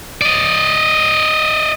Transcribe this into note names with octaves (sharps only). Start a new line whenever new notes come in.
D5 D#5